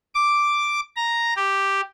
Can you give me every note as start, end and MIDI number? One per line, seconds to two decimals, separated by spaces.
0.15 0.80 86
0.96 1.34 82
1.37 1.81 67